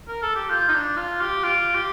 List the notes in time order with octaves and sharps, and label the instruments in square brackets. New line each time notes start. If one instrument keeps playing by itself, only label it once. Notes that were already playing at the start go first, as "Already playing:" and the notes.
[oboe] A#4
A4
G4
[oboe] F4 [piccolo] G6
[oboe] D#4
D4
F4
G4
[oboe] F4 [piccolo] D7
[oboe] G4